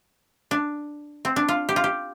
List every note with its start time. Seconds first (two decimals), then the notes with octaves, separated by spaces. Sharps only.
0.51 D4
1.25 C4
1.36 D4
1.48 F4
1.69 G4
1.76 F4
1.84 G4